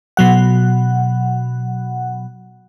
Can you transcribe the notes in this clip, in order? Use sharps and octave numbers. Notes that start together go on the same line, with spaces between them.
B2 F#3 F#5